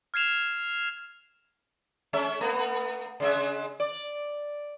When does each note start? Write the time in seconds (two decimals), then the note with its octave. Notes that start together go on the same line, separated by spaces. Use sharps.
0.14 F6 G#6 C7 E7 F7
2.13 G#3 C#4 E5
2.41 A3 B3
3.20 C#3 G#3 E5
3.80 D5